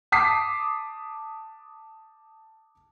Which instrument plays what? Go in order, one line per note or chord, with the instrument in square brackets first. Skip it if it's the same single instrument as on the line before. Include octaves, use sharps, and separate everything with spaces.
[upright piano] A5 D6 D#6 B6 C7